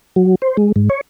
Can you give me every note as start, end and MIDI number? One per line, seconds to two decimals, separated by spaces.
0.16 0.35 54
0.42 0.57 72
0.57 0.72 56
0.76 0.89 44
0.90 1.01 73